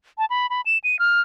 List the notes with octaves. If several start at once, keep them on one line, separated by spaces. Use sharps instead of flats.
A5
B5
B5
E7
D#7
F6